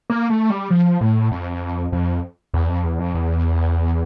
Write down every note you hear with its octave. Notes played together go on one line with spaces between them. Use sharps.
A#3
A3
G3
F3
A2
F2
F2
E2
F2
E2
F2
E2